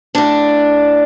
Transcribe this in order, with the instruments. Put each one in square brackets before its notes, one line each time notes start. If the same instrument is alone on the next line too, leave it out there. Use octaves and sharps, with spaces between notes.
[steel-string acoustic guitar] A2 D4